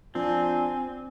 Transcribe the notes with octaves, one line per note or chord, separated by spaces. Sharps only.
F3 C4 D4 G#5